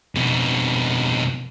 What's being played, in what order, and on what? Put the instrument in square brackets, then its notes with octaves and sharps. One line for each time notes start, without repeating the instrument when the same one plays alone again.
[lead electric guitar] F2 B2